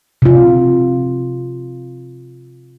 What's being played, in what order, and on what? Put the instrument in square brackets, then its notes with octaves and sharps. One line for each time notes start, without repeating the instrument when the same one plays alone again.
[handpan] C3 F4